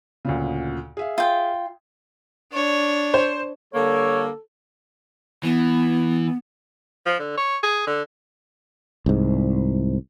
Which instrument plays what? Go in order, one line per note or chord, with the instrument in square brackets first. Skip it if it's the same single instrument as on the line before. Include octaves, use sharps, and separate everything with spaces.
[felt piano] D2 A#2 C#3
G#4 E5 F5
[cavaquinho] F4 G5
[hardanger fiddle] D4 C#5
[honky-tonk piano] C5
[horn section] D3 G3 A#3 [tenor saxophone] A4 [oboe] C#5
[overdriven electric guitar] E3 [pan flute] B3
[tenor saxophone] F3
D3
C#5
G#4
D3
[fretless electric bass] C2 G#2